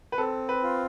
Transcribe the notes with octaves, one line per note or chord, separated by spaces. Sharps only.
B4
C4 A4
B4
F4